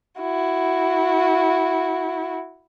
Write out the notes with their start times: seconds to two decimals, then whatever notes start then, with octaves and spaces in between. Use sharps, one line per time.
0.21 E4 F#4